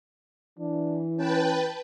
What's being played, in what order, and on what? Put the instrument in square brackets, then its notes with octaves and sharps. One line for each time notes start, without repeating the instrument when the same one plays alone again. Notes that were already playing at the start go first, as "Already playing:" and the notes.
[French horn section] E3 [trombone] D4
[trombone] C#4 [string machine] B4 G5 A5